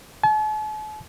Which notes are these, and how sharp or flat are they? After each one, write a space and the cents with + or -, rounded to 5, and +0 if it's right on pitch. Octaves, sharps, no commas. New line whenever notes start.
A5 -45